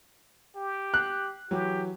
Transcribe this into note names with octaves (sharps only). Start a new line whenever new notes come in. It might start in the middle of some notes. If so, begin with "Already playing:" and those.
G4
F#6
E3 F#3 G4